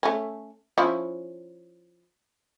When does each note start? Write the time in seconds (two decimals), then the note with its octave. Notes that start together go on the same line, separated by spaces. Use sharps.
0.03 A3 C#4
0.78 F3 C#4 E4